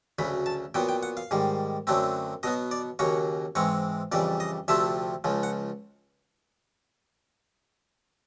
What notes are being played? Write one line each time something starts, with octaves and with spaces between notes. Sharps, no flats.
D2 C#3 F#3 B5
A5
A#2 F#3 B3 G5
G5
F#5
F5
G#2 D#3 G3
F#2 D3 F#3 A3 C4
B2 F#3 B3 D#5
D5
D#2 C#3 F#3 A#3 C#5
G#2 E3 G#3 C4 C#5
F2 C#3 E3 G3 D5
D#5
D2 C3 F3 A3 C4 E5
C#2 C#3 F3
F#5